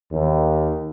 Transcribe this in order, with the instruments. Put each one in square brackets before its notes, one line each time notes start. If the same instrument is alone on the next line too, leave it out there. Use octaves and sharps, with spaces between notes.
[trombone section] D#2